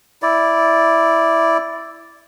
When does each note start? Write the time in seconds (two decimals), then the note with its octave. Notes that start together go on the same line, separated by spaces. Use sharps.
0.22 E4 D5